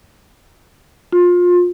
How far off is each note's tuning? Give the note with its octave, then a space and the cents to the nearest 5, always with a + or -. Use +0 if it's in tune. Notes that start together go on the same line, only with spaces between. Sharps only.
F4 +25